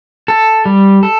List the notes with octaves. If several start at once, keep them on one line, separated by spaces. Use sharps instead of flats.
A4
G3
A4